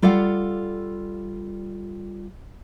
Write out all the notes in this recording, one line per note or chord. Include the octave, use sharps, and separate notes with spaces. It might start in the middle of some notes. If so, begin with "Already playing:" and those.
G3 F4 A4 D5 F5 F#5